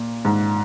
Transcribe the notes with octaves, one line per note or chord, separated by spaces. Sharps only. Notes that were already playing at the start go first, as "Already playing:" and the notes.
Already playing: A#2
G#2